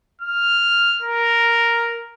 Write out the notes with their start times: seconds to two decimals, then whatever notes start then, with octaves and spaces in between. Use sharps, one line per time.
0.21 F6
1.02 A#4